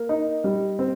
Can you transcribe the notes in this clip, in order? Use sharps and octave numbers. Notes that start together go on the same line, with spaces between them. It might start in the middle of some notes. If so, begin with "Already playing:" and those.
Already playing: A#3
D#4
G3
C4